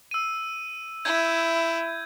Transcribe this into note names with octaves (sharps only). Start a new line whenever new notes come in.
E6 D#7
E4 G6 G#6